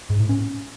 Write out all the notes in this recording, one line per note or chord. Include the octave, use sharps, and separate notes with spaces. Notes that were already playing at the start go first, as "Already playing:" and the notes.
G#2
A2
C#4